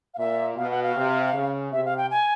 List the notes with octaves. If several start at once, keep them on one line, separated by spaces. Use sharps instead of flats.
F5
A#2 E5
B2 F5
F#5
F5
C3
C#3
C3 E5
F5
G5
G#5